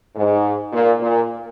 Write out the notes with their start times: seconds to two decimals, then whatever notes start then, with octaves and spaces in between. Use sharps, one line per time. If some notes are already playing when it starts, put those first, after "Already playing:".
0.16 G#2
0.72 A#2
1.01 A#2